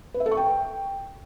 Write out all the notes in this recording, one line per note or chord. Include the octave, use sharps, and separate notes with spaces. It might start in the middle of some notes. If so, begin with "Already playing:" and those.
B4
E5
A4
C#6
G5